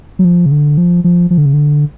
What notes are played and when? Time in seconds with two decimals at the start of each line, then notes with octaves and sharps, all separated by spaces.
0.19 F#3
0.25 F3
0.46 C#3
0.51 D3
0.78 F3
1.04 F3
1.31 F3
1.38 D3
1.46 C#3
1.53 D3